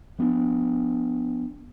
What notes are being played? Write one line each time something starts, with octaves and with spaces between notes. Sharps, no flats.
F3 B3 C#4 D4